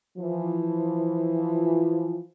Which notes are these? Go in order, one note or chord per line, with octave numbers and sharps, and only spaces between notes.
E3 F3